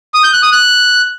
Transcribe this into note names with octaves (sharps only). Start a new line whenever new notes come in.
D#6
G6
F#6
D#6
F#6